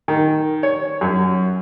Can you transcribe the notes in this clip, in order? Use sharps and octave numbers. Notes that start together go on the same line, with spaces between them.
D#3
C#5
F#2